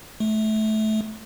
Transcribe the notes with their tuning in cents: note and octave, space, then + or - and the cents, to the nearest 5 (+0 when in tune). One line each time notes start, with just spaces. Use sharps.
A3 -20